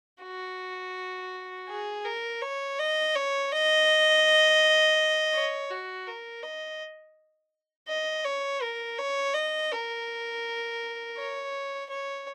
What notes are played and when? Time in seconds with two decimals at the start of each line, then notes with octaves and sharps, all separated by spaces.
0.23 F#4
1.69 G#4
2.05 A#4
2.41 C#5
2.79 D#5
3.15 C#5
3.52 D#5
5.34 C#5
5.70 F#4
6.07 A#4
6.43 D#5
7.88 D#5
8.25 C#5
8.62 A#4
8.99 C#5
9.34 D#5
9.72 A#4
11.18 C#5
11.90 C#5